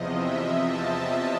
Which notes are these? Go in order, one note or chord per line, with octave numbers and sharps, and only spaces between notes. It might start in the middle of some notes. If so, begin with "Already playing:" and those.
Already playing: E2 C3 F3 D#5
E5
A5